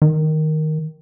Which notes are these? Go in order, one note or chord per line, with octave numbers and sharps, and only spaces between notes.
D#3